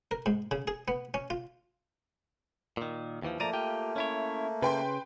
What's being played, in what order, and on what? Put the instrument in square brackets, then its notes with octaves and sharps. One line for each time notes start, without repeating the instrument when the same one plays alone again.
[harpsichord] A#4
G#2
C#3
G#4
B3
C#4
F4
[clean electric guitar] A#2 D#3
D#2 E3 F3
[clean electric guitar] F3 D5 A#5 [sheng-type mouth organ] A3 A#3 [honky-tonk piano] D#7
[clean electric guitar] F4 G4 G5
C#4 E4 C#5
[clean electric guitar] C#3 [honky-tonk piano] B4 G5 C6